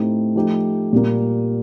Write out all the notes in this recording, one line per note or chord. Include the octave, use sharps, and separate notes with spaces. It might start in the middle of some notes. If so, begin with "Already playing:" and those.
Already playing: A2 A3 C4 D#4 G4
F3 A3 D#4 G4
A#2 G3 A#3